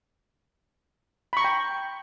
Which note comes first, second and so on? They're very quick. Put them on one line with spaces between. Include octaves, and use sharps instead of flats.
B5 C#6 A#5 G5